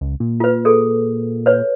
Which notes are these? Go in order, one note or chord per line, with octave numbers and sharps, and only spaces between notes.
C#2
A#2
F4 B4
G#4 A4
B4 C#5